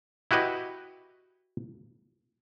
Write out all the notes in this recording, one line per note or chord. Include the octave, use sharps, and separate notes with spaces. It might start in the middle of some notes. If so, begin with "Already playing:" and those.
E4 F#4 G4 B4 D#5